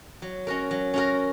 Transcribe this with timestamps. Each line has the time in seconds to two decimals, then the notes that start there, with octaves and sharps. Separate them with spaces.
0.22 F#3
0.47 C#4 F#4 A#4
0.71 F#3
0.94 C#4 F#4 A#4